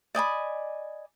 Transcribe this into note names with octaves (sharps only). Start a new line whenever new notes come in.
D5 D#5 G#5 B5